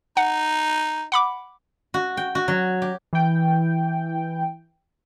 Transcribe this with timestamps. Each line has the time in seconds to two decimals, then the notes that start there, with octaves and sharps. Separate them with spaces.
0.17 D#4 F#5
1.12 F#5 B5 D6
1.94 F#4
2.17 G5
2.35 F#4
2.48 F#3
2.82 G4
3.13 E3 G5